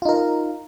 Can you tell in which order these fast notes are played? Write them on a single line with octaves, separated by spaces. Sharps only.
F4 D#4 A#4